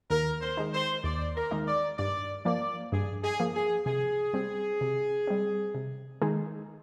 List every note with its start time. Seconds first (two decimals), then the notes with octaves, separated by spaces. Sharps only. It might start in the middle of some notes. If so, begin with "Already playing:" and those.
0.10 D#2 A#4
0.42 C5
0.57 D#3 G#3 D#4
0.74 C5
1.04 D#2 D5
1.36 A#4
1.51 D#3 G#3 D#4
1.68 D5
1.98 G2 D5
2.45 F3 A#3 D5
2.92 G2 G#4
3.23 G#4
3.40 F3 A#3
3.55 G#4
3.86 C3 G#4
4.34 G3 C4
4.81 C3
5.27 G3 C4
5.75 C3
6.22 D#3 G#3 D#4 G#4